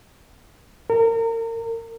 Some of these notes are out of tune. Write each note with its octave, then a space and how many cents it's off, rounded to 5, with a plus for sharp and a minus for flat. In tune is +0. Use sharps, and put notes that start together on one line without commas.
A#4 -35